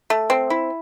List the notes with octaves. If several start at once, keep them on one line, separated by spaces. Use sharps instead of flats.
A3
C4
E4